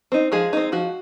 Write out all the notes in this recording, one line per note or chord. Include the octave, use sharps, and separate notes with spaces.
C4 D#4
F3 G#3 G#4
C4 D#4
F3 F#4